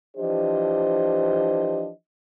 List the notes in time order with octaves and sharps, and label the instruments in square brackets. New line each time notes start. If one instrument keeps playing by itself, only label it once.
[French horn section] E3 F3 D4 G4 C5 D#5